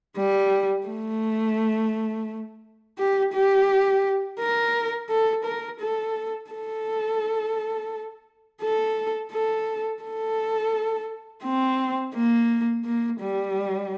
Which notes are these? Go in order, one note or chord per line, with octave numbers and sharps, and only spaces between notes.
G3
A3
G4
G4
A#4
A4
A#4
A4
A4
A4
A4
A4
C4
A#3
A#3
G3